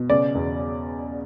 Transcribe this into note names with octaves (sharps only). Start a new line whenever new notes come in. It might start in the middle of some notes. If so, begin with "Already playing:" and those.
Already playing: B2
C#3 D5
E2